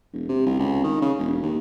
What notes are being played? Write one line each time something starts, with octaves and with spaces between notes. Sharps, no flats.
E1
C3
C2
C#2
D#3
C#3
E1
D#2